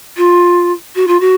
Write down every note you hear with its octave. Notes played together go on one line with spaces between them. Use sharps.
F4
F#4
F4
F#4